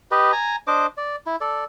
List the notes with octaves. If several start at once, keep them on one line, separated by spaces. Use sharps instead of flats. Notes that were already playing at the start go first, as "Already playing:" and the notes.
G4 B4 D#5
G#5 A#5
D4 C5 D#5 D6
D5
E4
A4 D5